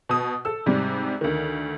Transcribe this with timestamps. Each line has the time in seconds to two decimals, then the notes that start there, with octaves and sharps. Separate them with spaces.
0.09 B2 D#6
0.45 A4 E6
0.66 G#2 C3 G3
1.21 D2 D#3